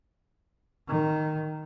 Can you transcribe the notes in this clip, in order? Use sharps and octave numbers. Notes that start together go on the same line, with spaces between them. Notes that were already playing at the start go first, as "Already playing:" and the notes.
D#3